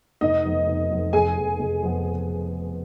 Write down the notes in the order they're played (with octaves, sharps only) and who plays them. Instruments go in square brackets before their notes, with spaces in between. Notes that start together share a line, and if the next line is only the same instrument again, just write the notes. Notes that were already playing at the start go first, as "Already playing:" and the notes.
[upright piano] F1 [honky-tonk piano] D#4 D#5
[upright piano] F2 F3 B3
F1
F2 F3 B3
[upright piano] F1 [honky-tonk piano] G#4 G#5
[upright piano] F2 F3 B3
F1
F2 F3 B3